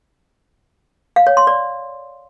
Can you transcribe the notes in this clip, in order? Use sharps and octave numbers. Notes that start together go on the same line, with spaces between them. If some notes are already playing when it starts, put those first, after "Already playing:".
F5
C#5
C6
D5